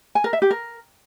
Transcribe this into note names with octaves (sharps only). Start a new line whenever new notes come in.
G#5
A#4
E5
G4
A#4